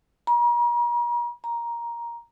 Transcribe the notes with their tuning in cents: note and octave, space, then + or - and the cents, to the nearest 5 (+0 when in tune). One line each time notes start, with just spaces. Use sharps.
A#5 +40
A#5 +10